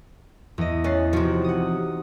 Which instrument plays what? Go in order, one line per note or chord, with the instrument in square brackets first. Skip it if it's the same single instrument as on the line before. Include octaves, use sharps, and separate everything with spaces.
[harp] E2 D#5
[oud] C#4 [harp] F#6 A6 C7
[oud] C3 F3 [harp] D#4 F#4
[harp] F#5 D#6